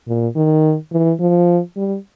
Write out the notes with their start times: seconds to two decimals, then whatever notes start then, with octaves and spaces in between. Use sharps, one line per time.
0.08 A#2
0.36 D#3
0.92 E3
1.20 F3
1.77 G3